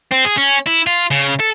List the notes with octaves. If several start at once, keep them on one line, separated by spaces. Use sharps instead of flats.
C4
G#4
C#4
E4
F4
C#3
A4